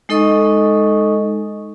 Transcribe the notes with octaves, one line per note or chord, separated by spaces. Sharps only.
G#3 D#4 A4 D#5 C#6 D#6